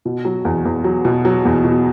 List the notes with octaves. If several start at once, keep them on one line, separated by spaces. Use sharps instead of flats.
B2
F#3
E2
E2
F#3
B2
F#3
E2
B2